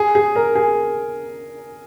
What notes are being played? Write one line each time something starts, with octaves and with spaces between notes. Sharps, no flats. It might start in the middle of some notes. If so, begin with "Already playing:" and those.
Already playing: G#4
G#4
A#4
G#4